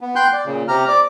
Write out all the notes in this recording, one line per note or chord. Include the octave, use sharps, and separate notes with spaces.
B3
G5 C6 F#6 G6
D5
A#2 C#3
C3 G4 A#5 F6
D5 D6